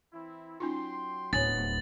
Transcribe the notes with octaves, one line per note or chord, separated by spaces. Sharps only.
E3 C4 E4
F#3 C#4 D#4 F4 G5 C6
D1 B2 F3 B3 C#5 G#5 A6 F#7